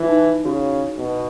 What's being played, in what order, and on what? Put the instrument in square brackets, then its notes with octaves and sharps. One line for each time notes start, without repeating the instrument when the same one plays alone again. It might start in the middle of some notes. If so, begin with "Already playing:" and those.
Already playing: [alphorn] E3 [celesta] E4
[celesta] D#4
[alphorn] C#3 [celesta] F#4
[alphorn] B2